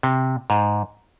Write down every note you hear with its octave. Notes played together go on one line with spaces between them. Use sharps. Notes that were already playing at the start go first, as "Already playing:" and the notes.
C3
G#2